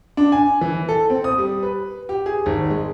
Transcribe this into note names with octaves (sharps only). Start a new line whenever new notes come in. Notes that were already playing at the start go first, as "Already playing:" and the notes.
D4
G#5
E3
A4
C4
D#6
G3
B4
G4
G#4
G#1
G#3